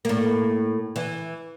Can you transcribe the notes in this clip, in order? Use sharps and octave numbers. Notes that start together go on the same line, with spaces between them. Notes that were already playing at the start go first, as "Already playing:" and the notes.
A2 A#3
E3